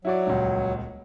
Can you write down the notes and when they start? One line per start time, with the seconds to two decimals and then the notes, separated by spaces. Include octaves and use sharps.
0.05 F#3 E4 F#4 D5
0.27 D#1 C#2